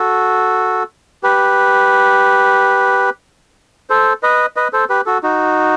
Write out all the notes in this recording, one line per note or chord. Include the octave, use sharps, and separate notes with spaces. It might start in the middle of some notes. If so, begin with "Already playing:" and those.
Already playing: F#4 A4
G4 B4
A4 C5
B4 D#5
B4 D#5
A4 C5
G4 B4
F#4 A4
D#4 F#4